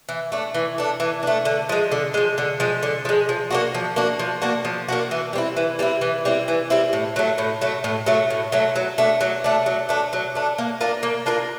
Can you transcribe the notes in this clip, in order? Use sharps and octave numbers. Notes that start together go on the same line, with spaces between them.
E3
A3 D4
E3
A3 D4
E3
A3 D4
D3
F3 G#3
D3
F3 G#3
D3
F3 G#3
D3
F3 G#3
F3
A#3 D4 F#4
F3
A#3 D4 F#4
F3
A#3 D4 F#4
F3
A#3 D4 F#4
E3
G3 C4 E4
E3
G3 C4 E4
E3
G3 C4 E4
E3
G3 C4 E4
A2
F#3 A3
A2
F#3 A3
A2
F#3 A3
A2
F#3 A3
F#3
A3 D4
F#3
A3 D4
F#3
A3 D4
F#3
A3 D4
A#3
D4 F4 A#4
A#3
D4 F4 A#4